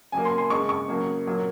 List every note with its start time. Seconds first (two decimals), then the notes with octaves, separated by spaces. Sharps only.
0.12 C#3 F#3 A#3 G#5
0.25 C6
0.38 C6
0.50 C#3 G#3 C#6
0.69 C#6
0.88 C#3 F#3 A#3
1.26 A#2 F#3 A#3